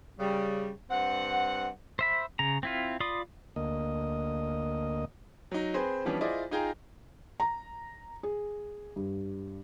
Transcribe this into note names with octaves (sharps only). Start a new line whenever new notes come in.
C#3 G3
G2 C4 F#5
C5 E5 B5
C#3 A#5
C4 E4 F4
F4 D5 B5 C6 D#6
D2 A#3 D#5
F#3 D#4
C4 G#4 B4 C5
E3 F3 G3 B3 C#4 D4
E4 F4 G#4 C5 D5 D#5
D#4 F4 G#4 G5 A#5
A#5
G#4
G2